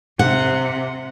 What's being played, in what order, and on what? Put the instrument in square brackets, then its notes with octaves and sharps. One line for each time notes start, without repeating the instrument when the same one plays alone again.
[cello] C3 [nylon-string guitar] F#5